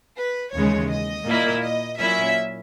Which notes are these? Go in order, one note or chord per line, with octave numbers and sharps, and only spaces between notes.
B4
D#2 C#3 E3 G#3 C#5
D#5
A#2 A#3 E4
D#5
A#2 F#3 C#4 E4 E5